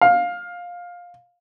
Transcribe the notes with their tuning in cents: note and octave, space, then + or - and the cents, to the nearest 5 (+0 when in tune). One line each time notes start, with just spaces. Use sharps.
F5 +15